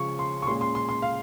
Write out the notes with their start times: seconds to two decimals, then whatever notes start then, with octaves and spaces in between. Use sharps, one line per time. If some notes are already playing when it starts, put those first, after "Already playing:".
Already playing: C#3 F3 G#3 C#4 C#6
0.19 C6
0.42 C#6
0.47 A#2 G#3 C#4 C6
0.61 C6
0.75 C6
0.89 C6
1.02 F5